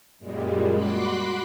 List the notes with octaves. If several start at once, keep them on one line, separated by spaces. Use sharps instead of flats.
F#2 A#2 G3 G#3
F#4 B5 C6 D6 F#6 B6